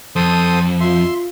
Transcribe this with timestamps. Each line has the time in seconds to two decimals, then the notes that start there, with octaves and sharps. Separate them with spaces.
0.16 F2 A4 C5 D#6
0.81 F4 E5 C6